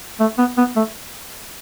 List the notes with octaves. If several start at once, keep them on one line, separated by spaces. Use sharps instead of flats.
A3
B3
B3
A3